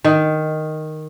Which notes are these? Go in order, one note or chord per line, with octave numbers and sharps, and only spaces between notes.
D#3